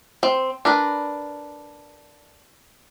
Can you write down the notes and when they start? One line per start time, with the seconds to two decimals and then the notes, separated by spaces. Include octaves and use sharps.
0.23 C4
0.65 D4 A#4 B4